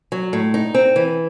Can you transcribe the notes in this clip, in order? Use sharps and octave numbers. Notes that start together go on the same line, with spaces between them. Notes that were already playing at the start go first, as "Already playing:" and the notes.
F#3
A2
D#4
C4
E3